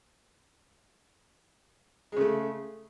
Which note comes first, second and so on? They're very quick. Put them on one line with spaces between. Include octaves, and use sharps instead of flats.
G#3 C#3 A3